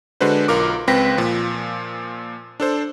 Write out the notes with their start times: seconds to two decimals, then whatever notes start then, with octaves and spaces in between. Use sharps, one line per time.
0.21 D3 G#3 D4 F#4 B4 C5
0.48 B1 F4 A#4 D6
0.87 C#2 C4 B4 G5 A#6 B6
1.18 A#2 F3
2.60 D4 A4 C5